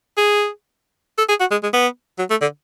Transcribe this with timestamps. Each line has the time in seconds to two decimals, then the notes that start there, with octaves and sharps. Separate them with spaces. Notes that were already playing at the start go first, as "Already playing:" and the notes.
0.17 G#4
1.18 A4
1.29 G#4
1.40 F#4
1.51 G#3
1.63 G#3
1.73 B3
2.18 F#3
2.30 A3
2.41 D3